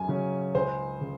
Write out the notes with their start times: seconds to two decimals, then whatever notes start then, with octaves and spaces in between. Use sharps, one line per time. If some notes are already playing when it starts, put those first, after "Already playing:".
Already playing: F#2 G#5
0.08 C#3 F#3 C#4
0.54 C#2 C5
1.01 C#3